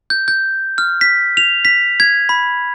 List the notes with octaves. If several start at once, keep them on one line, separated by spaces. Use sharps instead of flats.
G6
G6
F6
B6
F7
B6
G#6
B5